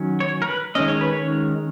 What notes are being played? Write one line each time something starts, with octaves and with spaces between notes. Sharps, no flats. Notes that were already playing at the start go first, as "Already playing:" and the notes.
Already playing: D#3 F#3 C#4
C#5
A#4
B4
D#3 G#3 C#4 D#5
C#5
B4
C#5